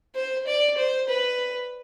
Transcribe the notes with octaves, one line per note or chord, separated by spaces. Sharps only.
C5
D5
C5
B4